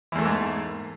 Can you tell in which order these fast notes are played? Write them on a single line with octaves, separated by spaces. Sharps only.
E3 E2 A3 A#3 G#2